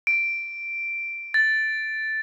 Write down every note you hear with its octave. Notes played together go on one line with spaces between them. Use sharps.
D7
A6